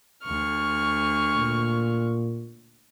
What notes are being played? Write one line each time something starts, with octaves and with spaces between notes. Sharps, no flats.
D2 C#6 F6
A#2